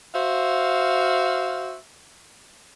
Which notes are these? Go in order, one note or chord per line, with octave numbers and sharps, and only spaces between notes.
F#4 C5 E5 F5